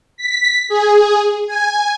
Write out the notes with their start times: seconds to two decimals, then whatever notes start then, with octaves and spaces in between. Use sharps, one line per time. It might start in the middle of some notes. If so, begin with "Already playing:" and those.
0.17 B6
0.68 G#4
1.47 G#5